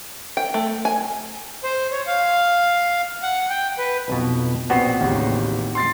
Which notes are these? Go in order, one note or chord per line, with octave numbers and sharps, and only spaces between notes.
G5
A3
G#5
C5
C#5
F5
F#5
G5
B4
B1 F2 B2
A#1 B3 C4 F#4 C7
A1 D#2 C#3
C6 A6 C7